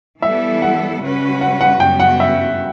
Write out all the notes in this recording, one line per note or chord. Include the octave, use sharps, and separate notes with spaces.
E3 G3 B3 E4 A4 E5
F#5
C#3 G3 C#4 F#4 B4
F#5
F#5
F#2 C#3 G3 B3 F#4 G5
F#5
E5